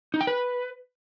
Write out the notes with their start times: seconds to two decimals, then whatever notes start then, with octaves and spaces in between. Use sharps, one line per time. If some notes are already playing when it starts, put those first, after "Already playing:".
0.14 D#4
0.21 G5
0.27 B4